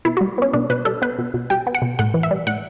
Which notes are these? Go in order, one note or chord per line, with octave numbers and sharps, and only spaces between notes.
B2 E4
F#4
G3
B3 C#4
B2 D4
B2 B4
G3 A4
B3 B4
B2
B2
G3 G5
B3
F#5
B2
A2 F#5
E3
E5
G3
A2 F#5